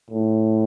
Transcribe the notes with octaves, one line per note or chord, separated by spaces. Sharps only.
A2